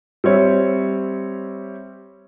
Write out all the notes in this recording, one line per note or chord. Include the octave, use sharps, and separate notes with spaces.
G3 C4 C#5 E5